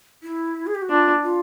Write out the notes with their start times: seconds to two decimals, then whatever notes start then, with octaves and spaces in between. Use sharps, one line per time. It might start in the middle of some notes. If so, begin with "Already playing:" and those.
0.23 E4
0.67 G#4
0.75 G4
0.82 F#4
0.90 D4 F4
1.23 F4